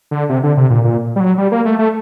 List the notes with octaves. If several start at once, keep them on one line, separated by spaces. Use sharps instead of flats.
D3
C3
D3
C3
A#2
A#2
G3
F#3
G3
A#3
A3
A3